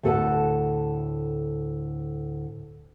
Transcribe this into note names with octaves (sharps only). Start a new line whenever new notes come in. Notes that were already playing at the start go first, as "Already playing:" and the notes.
D2 A2 A4 B4 F#5 A5